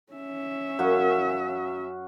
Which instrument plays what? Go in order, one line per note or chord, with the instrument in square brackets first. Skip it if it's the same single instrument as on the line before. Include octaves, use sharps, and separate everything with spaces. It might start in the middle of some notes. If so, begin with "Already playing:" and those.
[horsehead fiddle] C#4 E5
[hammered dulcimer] F#2 F#4 F5